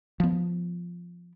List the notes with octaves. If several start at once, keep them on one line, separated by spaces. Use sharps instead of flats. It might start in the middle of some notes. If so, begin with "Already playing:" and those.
F3 B3